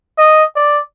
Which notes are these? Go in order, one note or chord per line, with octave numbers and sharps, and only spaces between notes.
D#5
D5